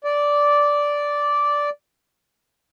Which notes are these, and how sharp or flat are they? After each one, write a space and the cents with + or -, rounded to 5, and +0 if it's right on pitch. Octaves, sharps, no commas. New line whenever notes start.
D5 -10